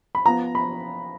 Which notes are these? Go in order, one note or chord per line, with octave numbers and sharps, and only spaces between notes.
B5
F3 B3 A#5
B5